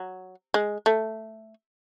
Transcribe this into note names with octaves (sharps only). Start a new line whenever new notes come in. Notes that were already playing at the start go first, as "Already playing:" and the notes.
Already playing: F#3
G#3
A3